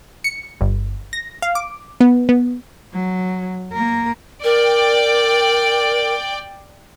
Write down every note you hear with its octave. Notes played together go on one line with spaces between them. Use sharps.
C#7
G1
A#6
F5
D6
B3
B3
F#3
A#3 A#4
A#4 D5 G5